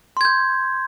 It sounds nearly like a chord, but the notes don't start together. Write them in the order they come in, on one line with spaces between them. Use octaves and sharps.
C6 G#6 G6